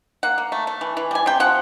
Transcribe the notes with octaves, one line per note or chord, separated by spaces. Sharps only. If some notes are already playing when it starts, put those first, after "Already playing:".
A#3 F#5
A#3
A3
A3
E3
E3
G3 G#5
C3 G5
F3 F#5